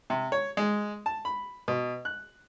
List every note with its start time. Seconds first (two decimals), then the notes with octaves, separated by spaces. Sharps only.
0.10 C3
0.32 C#5
0.57 G#3
1.06 A5
1.25 B5
1.68 B2
2.05 F#6